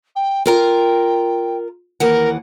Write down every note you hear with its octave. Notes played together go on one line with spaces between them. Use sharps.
G5
F4 A#4 G5 A#5
D#2 E3 A#4 F#5